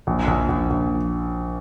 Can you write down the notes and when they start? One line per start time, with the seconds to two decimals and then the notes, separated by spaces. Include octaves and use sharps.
0.07 A#1
0.27 A#1
0.49 A#1
0.70 A#1